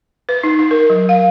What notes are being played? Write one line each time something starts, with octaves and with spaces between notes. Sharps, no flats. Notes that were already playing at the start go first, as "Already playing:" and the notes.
B4
D#4
D#4
A#4
F#3
F5